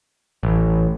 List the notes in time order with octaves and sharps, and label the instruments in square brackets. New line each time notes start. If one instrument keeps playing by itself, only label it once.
[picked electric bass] A1